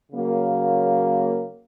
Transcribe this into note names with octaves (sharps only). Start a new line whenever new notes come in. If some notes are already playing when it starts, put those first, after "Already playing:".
C#3 F#3 A#3